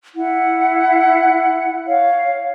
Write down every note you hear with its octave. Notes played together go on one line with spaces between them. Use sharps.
E4 F#5
C#5 F5